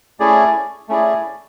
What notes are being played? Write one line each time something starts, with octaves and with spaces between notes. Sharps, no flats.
A3 C#4 E4 G#4 D5
A3 C#4 E4 G#4 D5